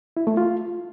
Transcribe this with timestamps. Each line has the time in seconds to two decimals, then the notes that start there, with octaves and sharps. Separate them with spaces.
0.17 E4
0.27 A3
0.37 F4